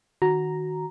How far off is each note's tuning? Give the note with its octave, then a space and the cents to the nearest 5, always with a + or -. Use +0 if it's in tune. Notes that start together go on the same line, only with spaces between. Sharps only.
D#3 +0 F#4 +0 A#5 +0